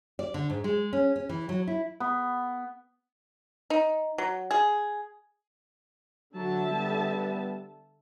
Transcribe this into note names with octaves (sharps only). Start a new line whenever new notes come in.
D5
D3
G#2
G#3
C#4
C#4
E3
F#3
E4
B3
D#4
F#3
G#4
D3 F#3 E5 A5
G3 B3